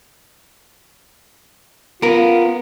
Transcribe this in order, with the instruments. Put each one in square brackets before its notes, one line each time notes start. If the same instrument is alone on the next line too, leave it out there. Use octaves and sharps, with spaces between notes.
[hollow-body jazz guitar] B3 A#4 [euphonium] F4